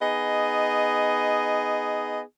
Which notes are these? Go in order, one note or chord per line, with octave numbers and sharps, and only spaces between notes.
B3 D#4 G#4 D#5